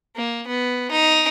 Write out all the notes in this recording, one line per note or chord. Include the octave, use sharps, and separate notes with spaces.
A#3
B3
D#4